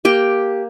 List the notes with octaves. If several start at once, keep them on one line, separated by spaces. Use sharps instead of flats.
A#3 G4 G5